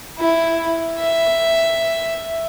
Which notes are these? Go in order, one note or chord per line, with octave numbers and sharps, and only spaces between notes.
E4
E5